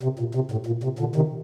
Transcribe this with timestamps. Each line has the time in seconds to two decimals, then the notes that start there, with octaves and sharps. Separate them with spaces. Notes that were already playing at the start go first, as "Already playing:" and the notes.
0.03 C3
0.19 A#2
0.35 C3
0.52 A2
0.66 A#2
0.84 C3
0.99 A#2 D3
1.16 C3 D#3